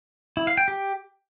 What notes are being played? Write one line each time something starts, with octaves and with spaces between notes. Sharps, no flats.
E4
F5
G5
G4